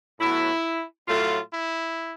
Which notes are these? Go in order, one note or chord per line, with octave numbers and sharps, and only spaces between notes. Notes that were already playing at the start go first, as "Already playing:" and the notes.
A2 F#3 B3 E4
A2 F#3 A3 F4
E4